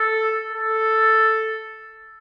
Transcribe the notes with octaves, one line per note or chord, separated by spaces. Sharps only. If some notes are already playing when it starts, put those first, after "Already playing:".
Already playing: A4
A4